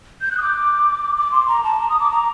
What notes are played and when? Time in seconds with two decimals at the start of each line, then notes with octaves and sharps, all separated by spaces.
0.21 G6
0.31 F#6
0.38 D#6
0.42 D6
1.17 D6
1.32 C6
1.48 A#5
1.63 A5
1.80 A#5
1.90 D#6
2.00 D6
2.11 A#5